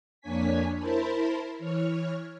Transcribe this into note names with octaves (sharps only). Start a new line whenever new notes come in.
F2 A#3 D4 C#5 G#5 B6
E4 A#4 C5 A5 B5
E3 C#5 F6